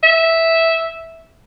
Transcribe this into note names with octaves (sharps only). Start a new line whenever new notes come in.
E5